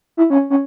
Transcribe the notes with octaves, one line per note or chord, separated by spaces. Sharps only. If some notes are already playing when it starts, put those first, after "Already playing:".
E4
C#4
C#4